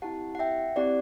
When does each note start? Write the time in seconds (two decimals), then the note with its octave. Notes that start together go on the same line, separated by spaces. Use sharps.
0.02 C4 E4 G4 F#5 A5
0.35 F#5
0.39 E5 G5
0.76 C4 E4 G4 D5 F#5